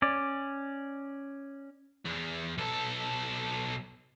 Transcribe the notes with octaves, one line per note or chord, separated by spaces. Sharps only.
C#4 D5
E2
B1 A4